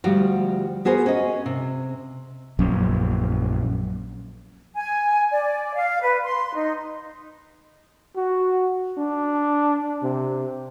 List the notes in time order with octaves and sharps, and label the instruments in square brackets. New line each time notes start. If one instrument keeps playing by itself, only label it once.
[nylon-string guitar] D2 F3 G3 F#4
B3 F#4 G#4 A#4 C5
C#4 D#5
C3
[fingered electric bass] A#1 F#2
[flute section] G#5
D5
F5
B4
C6
D#4
[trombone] F#4
D4
C3